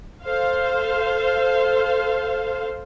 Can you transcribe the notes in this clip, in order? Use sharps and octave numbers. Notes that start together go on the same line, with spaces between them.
A4 C5 F5